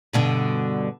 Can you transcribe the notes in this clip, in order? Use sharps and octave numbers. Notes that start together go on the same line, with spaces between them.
G2 B2 D3